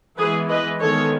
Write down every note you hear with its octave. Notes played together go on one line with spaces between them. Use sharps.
E3 G#3 B3 G#4 B4
B4 D#5
D#3 G#3 B3 A4 C#5